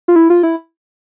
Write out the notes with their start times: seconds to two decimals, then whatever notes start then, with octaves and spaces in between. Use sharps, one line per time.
0.08 F4
0.16 E4
0.30 F4
0.43 E4